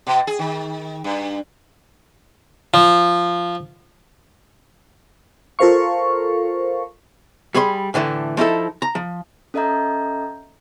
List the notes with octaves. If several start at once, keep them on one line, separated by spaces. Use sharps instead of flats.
B2
G#4
D#3
G2
F3
F4 A4 A#4 C5 F5 C#6
G3 G#4 B5 C6
A2 D3 E3 A3
F3 D#4 E4 A4
A#5
F3
C#4 A4 D#5 E5 A#5 G6